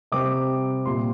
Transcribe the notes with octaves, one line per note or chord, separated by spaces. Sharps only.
C3 G3 C4 D6
A#2 G3 A#3 C6